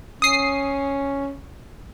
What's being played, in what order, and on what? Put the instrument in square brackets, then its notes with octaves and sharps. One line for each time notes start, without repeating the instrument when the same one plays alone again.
[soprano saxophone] C#4 [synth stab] D#6 C7